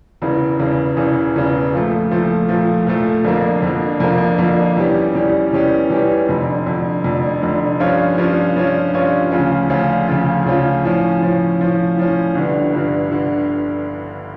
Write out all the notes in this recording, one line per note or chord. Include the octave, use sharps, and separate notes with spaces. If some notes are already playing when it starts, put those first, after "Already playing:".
E1 E2 C#3 E3
E1 E2 C#3 E3
E1 E2 C#3 E3
E1 E2 C#3 E3
A#2 F3 A3
A#2 F3 A3
A#2 F3 A3
A#2 F3 A3
F2 D3 F3 A#3 D4
F2 D3 F3 A#3 D4
F2 D3 F3 A#3 D4
F2 D3 F3 A#3 D4
E2 E3 G3 C#4 G4
E2 E3 G3 C#4 G4
E2 E3 G3 C#4 G4
E2 E3 G3 C#4 G4
F1 F2 D3
F1 F2 D3
F1 F2 D3
F1 F2 D3
G2 F3 C#4 F4 C#5
G2 F3 C#4 F4 C#5
G2 F3 C#4 F4 C#5
G2 F3 C#4 F4 C#5
D2 C#3 F3 C#4 F4
D2 C#3 F3 C#4 F4
D2 C#3 F3 C#4 F4
D2 C#3 F3 C#4 F4
A2 F3 C#4
A2 F3 C#4
A2 F3 C#4
A2 F3 C#4
G1 G2 D3
G1 G2 D3
D3